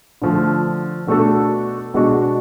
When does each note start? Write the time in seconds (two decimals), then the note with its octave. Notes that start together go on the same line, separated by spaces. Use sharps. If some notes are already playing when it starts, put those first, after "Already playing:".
0.22 D3 F3 A3
1.07 B2 A3 D4 F#4 A4
1.94 B2 G#3 D4 F#4